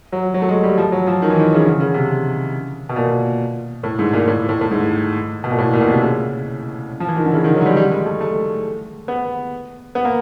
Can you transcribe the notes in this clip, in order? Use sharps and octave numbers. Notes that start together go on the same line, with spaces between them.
F#3
F#3
A3
G#3
G3
F3
F#3
F3
D#3
E3
D#3
C#3
D3
C#3
C3
B2
A#2
A2
G#2
A#2
A2
A2
A2
G#2
B2
A#2
A2
A#2
B2
C3
C#3
F3
E3
D#3
D3
C#3
D#3
F#3
G#3
G3
G3
G#3
A3
A3
B3
B3
A#3